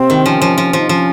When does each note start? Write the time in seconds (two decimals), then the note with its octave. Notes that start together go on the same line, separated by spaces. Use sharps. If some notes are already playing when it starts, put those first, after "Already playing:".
Already playing: C3 A#3 C4
0.10 D#3
0.26 F3 C#4
0.42 F3
0.58 F3
0.73 F3
0.78 D#4
0.89 F3 C#4